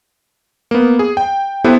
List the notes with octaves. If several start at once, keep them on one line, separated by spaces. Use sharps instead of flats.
A#3 B3
G#4
G5
B3 E4 G4 A4 B4 C5